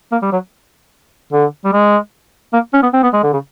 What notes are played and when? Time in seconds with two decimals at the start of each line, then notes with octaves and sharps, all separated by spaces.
0.12 A#3
0.22 G3
0.32 F#3
1.33 D3
1.65 G3
1.73 G#3
2.53 A#3
2.73 C#4
2.83 B3
2.93 C4
3.03 B3
3.13 G#3
3.23 D3
3.33 C#3